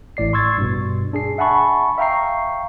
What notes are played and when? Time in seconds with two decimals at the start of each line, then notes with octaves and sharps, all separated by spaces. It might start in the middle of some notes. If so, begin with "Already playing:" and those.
0.17 A1 A2 D5 C7
0.33 C6 C#6 E6 G#6 A6
0.58 G2 B2
1.13 D4 G#4 C7
1.38 E5 F#5 G#5 A5 B5 C#6
1.98 E5 F5 G5 A#5 C#6 C7